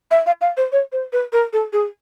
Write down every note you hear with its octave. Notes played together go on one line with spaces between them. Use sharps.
E5
F5
F5
C5
C#5
C5
B4
A#4
A4
G#4